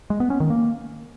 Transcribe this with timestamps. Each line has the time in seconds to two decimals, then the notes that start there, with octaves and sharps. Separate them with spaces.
0.10 G#3
0.20 B3
0.30 C#4
0.40 D#3
0.50 A#3